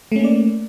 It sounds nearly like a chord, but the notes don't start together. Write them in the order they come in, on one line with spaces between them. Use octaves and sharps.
A3 C#4 A#3 D5